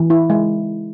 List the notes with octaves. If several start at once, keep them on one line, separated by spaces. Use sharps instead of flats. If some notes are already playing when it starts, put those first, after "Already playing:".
Already playing: E3
E4
G#3